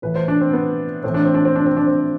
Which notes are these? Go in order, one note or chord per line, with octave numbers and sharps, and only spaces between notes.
A2 E3 B4
C5
D4
C4
B3
A2 E3 C4
D4
C4
D4
C4
D4
C4
D4
C4